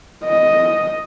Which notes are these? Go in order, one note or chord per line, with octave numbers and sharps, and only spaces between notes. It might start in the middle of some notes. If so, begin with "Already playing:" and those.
D#5